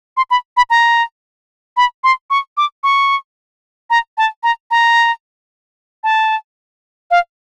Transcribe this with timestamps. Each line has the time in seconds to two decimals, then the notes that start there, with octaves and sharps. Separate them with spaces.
0.17 C6
0.31 B5
0.57 B5
0.70 A#5
1.77 B5
2.04 C6
2.30 C#6
2.57 D6
2.84 C#6
3.90 A#5
4.18 A5
4.43 A#5
4.71 A#5
6.04 A5
7.11 F5